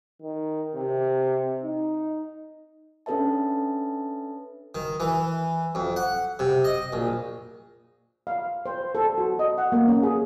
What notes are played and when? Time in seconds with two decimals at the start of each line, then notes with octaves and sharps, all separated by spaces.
0.22 D#3
0.76 C3
1.63 D#4
3.06 C#4 D4 A4 B4 E5 A5
4.75 D#3
5.00 E3
5.75 F2
5.96 F#5
6.39 C3
6.64 D#5
6.93 A#1
8.27 F5
8.66 C5
8.95 A4
9.18 F#4
9.39 D#5
9.58 F#5
9.72 A#3
9.88 C#4
10.03 G#4